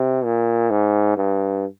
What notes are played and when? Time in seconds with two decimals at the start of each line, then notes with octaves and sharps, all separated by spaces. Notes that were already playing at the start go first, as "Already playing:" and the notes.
Already playing: C3
0.24 A#2
0.70 G#2
1.17 G2